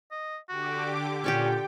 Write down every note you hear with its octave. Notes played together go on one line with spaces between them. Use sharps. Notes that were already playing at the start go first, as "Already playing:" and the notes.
D#5
D3 F#4 G4 D6
A#2 C#4 G4 D5 G5 C#6